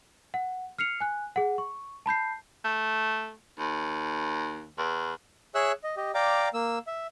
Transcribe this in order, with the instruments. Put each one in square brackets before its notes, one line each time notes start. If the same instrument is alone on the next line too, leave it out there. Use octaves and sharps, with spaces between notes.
[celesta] F#5
F6 C7 C#7 F7
G#5 F#6
G#4 F#5
C#6
A5 B5 G6 C7
[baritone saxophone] A3
D#2
E2
[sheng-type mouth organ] G#4 C#5 E5 E6 F#6
D#5
G4 D#5
D5 F5 G5 A#5 D6
A#3 E6
E5